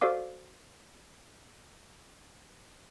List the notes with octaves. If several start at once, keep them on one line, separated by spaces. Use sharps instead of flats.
F#4 A4 C5 D5 F5 D6